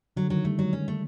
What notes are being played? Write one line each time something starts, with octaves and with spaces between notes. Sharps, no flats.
D3 F#3
D#3 F#3
G3 A3
F#3 G#3
C#4
A3